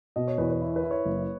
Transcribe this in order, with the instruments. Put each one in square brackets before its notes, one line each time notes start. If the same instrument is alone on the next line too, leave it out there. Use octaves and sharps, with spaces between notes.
[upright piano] B2 [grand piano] D#5
[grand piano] C#5
[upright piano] E2 [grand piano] B4
[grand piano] B4
[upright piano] E4
[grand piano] B4
[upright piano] E4
[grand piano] C#5
[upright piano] F#1